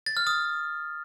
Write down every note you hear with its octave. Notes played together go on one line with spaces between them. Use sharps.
A6
F6
D#6